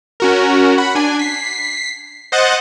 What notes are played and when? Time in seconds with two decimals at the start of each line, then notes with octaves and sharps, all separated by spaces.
0.20 C#4 F#4 A#4
0.78 F#5 B5
0.95 D4 G#5
1.19 B6 C7
2.32 C5 D#5 F#5 F#6 G6 A6